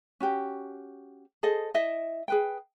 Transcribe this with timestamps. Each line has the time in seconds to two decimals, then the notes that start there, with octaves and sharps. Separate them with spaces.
0.20 C#4 F#4 G4
1.43 G#4 A4 C5 D#5
1.74 E4 D#5 E5
2.28 G#4 B4 G5